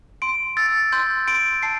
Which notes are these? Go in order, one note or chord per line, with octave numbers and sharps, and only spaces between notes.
C6 D7
E6 A6
C6 G6
C6 D7
A5 C7